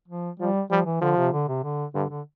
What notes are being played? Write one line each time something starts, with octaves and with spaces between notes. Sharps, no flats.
F3
F3 G3
F3 G3
E3
D3 F3
C3
D3
C3
D3
G2 D3
D3